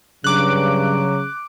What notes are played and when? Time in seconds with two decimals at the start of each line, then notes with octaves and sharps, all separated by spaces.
0.24 G2 C#3 F#3 D6 F#6